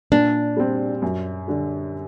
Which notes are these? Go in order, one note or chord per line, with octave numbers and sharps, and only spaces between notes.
A#2 D4
G3 C4
F#2
D3 G3